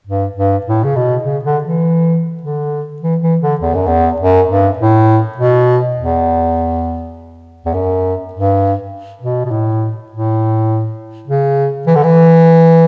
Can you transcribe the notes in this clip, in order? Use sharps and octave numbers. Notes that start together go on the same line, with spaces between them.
G2
G2
A2
C#3
B2
C#3
D3
E3
D3
E3
E3
D3
E2
F#2
E2
F#2
G2
A2
B2
E2
E2
F#2
G2
B2
B2
A2
A2
C#3
E3
D3
E3